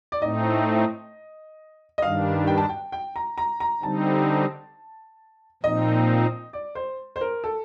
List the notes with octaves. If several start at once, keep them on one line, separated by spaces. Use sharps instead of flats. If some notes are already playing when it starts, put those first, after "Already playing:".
D5
A2 A3 C4 D#4 D#5
D#5
G2 D#3 G3 D4 F5
G5
A5
G5
G5
A#5
A#5
A#5
D3 G3 C4 D#4 A5
A#2 F3 C4 D#4 D#5
D5
C5
C5
A#4
A4